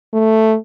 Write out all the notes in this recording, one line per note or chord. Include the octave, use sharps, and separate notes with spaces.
A3